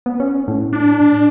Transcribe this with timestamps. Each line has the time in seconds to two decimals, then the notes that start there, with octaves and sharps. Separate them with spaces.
0.06 B3
0.20 C#4
0.48 A2
0.73 D4